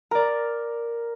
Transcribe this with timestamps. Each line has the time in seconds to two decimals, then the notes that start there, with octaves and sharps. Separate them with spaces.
0.11 A#4 D5 A#5